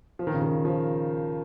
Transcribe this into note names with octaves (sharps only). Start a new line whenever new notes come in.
F3
D#3
C#3
D#3
F3